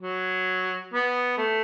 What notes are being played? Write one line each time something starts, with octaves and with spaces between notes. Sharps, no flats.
F#3
B3
A3